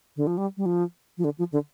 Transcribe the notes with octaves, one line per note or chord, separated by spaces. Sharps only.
D3
F3
G3
G3
F3
F3
D3
F3
D3